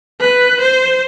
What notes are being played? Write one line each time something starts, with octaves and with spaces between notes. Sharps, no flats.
B4
C5